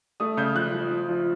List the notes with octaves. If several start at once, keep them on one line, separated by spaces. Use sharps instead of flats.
A3 D#6
C#3 G6
F3 F#6
F3
F3
F3